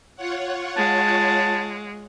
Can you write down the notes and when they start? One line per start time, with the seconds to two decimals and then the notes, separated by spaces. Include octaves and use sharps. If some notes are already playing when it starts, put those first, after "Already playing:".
0.16 F4 C#5 F#5
0.77 G#3 A5